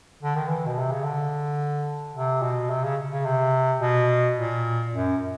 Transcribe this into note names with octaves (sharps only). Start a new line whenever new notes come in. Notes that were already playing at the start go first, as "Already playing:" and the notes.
D3
D#3
E3
B2
C3
C#3
D3
C3
B2
C3
C#3
C#3
C3
B2
A#2
F#2